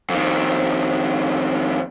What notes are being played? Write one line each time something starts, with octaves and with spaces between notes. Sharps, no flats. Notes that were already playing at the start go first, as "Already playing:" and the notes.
F2 D#3